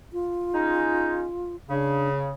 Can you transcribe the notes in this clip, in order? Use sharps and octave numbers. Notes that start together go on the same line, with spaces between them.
F4
G#3 C#4 D#4
C#3 D4